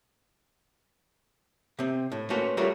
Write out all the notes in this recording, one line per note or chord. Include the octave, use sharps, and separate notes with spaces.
C3 C4
A2
A3 A#3 C#4 F#4 B4 C5
G3 A3 F4 F#4 A#4 C#5